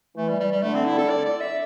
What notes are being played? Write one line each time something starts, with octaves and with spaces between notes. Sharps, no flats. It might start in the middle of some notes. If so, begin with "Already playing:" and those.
E3 A3
G3
G3
G3
D3 A3
C4
E4
A4
D5
D5
E5